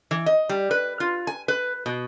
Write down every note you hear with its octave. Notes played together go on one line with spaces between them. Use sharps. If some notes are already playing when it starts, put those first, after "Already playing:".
E3
D#5
G3
B4
F4
G#5
B4
B2